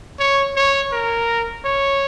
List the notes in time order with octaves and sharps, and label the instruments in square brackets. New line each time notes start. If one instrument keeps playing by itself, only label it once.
[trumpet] C#5
C#5
A#4
C#5